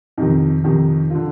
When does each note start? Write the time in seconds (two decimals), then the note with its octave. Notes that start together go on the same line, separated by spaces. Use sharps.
0.18 F2 C3 D#3 D#4
0.64 F2 C3 D#3
1.10 D3 F4